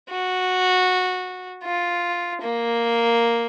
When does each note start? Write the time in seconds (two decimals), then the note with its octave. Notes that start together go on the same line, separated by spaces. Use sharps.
0.10 F#4
1.64 F4
2.42 A#3